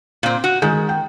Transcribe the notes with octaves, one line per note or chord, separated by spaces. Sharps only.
A#2 C4
F#4
D#3 G#3 G#5 G6
G5